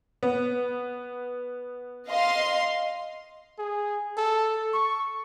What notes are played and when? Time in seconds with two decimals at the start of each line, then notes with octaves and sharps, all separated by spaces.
0.23 B3
2.08 D#5 F5 C6
3.58 G#4
4.17 A4
4.74 C#6